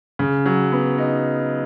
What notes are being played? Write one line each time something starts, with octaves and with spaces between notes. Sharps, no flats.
C#3
F#3
B3
D#4